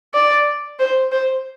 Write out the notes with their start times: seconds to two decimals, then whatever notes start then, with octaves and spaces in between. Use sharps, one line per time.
0.14 D5
0.79 C5
1.12 C5